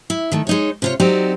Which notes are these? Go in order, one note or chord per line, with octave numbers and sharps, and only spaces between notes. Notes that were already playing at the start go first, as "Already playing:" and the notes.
E4
D#3 A3
G#3 D#4 C#5
C3 F4 C#5
F#3 C4 D#4 F#4 G4 D5